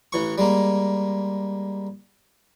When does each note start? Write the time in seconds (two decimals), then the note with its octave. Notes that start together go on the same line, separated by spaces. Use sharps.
0.13 A1 E3 C#6
0.38 G3 G#3 A#3